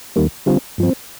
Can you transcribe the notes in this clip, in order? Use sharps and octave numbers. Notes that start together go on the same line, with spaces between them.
D#2 D#3 G3 A#3
D3 G3 C4 F4
G2 F3 C4